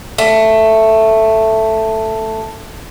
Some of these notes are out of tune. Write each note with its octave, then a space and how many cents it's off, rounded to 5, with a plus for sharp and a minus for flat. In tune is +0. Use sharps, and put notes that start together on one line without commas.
A3 +5